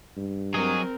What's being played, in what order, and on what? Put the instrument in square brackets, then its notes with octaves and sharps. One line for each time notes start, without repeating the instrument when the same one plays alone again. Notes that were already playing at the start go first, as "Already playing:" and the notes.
[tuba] G2
[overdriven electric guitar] F#3 [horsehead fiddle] C4 A#4 [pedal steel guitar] G#4 D#5